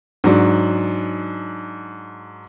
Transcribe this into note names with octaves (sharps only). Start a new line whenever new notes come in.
G#2 F#3 D4